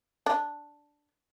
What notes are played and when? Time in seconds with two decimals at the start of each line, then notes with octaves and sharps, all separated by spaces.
0.26 D4